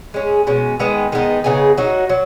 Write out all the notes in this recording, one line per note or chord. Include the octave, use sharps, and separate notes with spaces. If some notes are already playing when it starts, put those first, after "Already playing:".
G#3 C#4 G#4
B2 G#3 C#4
D#3 G#3 B3
D#3 G#3 B3 D#4
C#3 B3 D#4 G#4
F#3 D#4 F#4
F#3